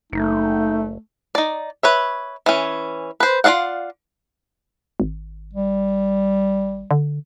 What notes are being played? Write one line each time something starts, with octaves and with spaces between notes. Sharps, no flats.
F#1 A3 D#4
D#4 D5
B4 C#5 E5
E3 C#4
B4 C5
F4 G#4 D5 F5 F#5
G#1
G3
D3